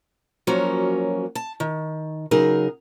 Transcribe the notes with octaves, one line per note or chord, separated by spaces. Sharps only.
F3 F#3 A#3 C#4 F#4 A#4
A5
D#3
C#3 F#3 D#4 G#4 A#4